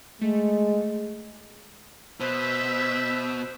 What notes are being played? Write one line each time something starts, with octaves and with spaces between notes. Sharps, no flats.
G#3 A3
B2 C5 E5